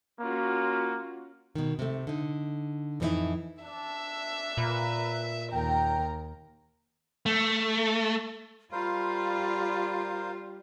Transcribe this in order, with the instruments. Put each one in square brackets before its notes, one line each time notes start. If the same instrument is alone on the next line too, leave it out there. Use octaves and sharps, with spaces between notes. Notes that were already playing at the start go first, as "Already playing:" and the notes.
[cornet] A#3 [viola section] C#4 F4 F#4
[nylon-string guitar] B2 D#3
C3 A3
D3 D#4
F2 A2 E3 C#4 D#4 E4
[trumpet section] D4 [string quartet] E5 E6
[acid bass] A#2 [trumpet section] A#4 B4
[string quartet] D#2 A#4 A#5 [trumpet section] G5
[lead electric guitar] A3
[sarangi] G3 [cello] F4 [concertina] A#4 C5 F5 [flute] B5